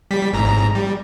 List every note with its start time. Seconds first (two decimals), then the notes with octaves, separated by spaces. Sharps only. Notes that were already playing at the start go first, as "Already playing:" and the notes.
0.11 G3 B6
0.33 G#1 G#2 A#5
0.75 G3